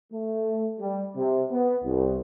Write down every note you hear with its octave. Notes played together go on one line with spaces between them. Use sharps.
A3
G3
C3
B3
C2